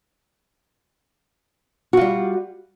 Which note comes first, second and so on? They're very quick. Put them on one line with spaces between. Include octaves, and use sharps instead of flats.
F#4 F4 G3